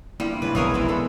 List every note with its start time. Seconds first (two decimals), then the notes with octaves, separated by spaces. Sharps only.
0.20 G2 F3 G3 A#3 E4
0.42 C#2 C3 C#4 B4 D5
0.55 F1 B1 E3 G#3 B3 G#4 A#4 C#5
0.74 C3 C4 E4
0.88 E3 A4